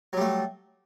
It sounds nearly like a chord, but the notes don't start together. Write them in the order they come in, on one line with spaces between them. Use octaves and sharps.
F#3 G3 A3